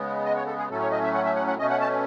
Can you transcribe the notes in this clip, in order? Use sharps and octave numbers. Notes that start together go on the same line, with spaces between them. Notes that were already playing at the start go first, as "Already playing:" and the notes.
Already playing: C#3 G#3 B3
D#5
C#5
A4
G#4
A2 F#3 A3 C#4 A4
C#5
D#5
E5
F#5
E5
F#5
F#5
B2 A3 C#4 D#5
F#5
A5